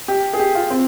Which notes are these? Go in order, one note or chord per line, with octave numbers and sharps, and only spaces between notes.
G4
G#4
G4
F4
C4